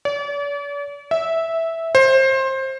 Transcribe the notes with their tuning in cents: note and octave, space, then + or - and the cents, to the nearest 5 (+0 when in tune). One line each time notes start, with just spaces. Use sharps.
D5 -45
E5 -10
C5 +20